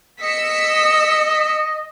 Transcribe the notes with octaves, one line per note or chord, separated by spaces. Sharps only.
D#5 E6 B6 C#7